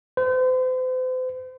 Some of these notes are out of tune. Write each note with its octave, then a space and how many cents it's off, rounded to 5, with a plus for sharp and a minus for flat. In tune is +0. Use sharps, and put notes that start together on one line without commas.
C5 -40